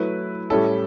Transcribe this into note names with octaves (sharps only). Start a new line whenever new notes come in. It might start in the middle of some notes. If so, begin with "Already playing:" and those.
Already playing: F#3 A3 E4 B4
A2 G3 C#4 E4 A4